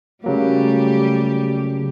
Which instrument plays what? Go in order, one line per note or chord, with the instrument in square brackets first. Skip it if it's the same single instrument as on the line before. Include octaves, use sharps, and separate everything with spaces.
[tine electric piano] C#3 F#3 A#3 [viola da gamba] G3 A3 G4